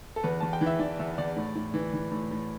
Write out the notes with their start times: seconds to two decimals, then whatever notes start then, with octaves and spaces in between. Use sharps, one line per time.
0.16 A4
0.23 E2 B4
0.40 E2 A5
0.53 G5
0.61 E3
0.66 E5
0.79 E3 D5
0.99 E2 E5
1.18 E2 D5
1.36 A2
1.55 A2
1.74 E3
1.93 E3
2.12 A2
2.31 A2